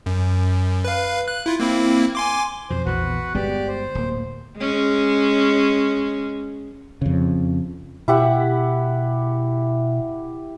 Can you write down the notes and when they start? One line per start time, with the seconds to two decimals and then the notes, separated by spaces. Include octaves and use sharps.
0.06 F#2
0.84 B4 F5
1.28 F#6
1.46 E4 F4
1.60 A#3 C4 E4
2.15 G#5 C6 D6
2.70 F2 B2 C5
2.86 A#1 E2 F#4 B4
3.35 G1 G#3 B3 G4 D5
3.68 C5
3.95 D1 A#3
4.58 G#3 C#4
7.02 F2 C#3
8.08 B2 E4 G4 F#5